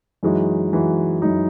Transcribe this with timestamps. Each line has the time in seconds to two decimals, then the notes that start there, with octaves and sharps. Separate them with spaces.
0.23 F#2 E3 G#3 D#4 F#4
0.72 F#2 E3 G#3 D#4 F#4
1.21 F#2 E3 G#3 D#4 F#4